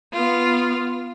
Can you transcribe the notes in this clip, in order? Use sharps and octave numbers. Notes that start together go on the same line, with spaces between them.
B3 F4